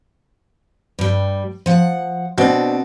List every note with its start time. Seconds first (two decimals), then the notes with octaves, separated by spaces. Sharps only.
0.99 G2 G3
1.66 F3 F#5
2.38 B2 C4 D4